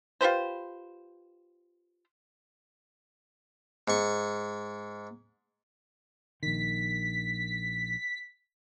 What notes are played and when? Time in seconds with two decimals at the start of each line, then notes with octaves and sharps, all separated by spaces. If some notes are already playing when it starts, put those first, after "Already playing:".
0.21 F4 G4 B4 C5
3.88 G#2 C#6
6.43 A#1 D#3 B6